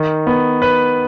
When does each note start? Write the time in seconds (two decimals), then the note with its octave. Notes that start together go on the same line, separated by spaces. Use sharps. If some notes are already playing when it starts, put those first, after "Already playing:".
Already playing: D#3
0.27 B3
0.62 B4